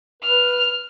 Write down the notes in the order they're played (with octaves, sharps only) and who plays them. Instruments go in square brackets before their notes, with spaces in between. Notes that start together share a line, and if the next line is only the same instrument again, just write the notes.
[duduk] B4 [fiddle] F6